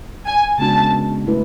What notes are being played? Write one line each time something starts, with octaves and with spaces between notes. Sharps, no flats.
G#5
C#3 G#3 B3 D4 F#4 A5
F#3 A3 E4 B4